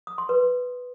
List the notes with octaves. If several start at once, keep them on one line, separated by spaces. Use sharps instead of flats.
D#6
C6
B4